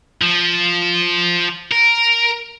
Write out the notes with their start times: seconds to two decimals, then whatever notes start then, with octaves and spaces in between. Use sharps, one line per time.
0.22 F3
1.72 A#4